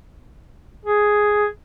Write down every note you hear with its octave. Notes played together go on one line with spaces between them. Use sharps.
G#4